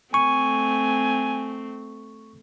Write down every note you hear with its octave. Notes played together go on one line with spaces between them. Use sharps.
A3 C4 G#5 C#6